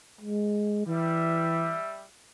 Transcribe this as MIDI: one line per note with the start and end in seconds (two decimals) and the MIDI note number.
0.21 0.82 56
0.87 1.77 52
0.87 2.04 55
0.87 2.04 76